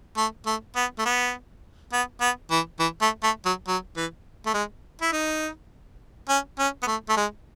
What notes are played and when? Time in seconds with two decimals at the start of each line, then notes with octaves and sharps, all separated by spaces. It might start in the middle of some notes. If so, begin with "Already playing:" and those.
0.17 A3
0.46 A3
0.76 B3
0.99 A3
1.06 B3
1.93 B3
2.21 B3
2.51 E3
2.80 E3
3.02 A3
3.23 A3
3.46 F#3
3.68 F#3
3.97 E3
4.46 A3
4.54 G#3
5.02 E4
5.13 D#4
6.29 C#4
6.59 C#4
6.83 B3
6.87 A3
7.09 A3
7.17 G#3